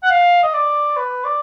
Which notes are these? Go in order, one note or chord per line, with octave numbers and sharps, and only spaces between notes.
F#5
F5
D#5
D5
B4
D5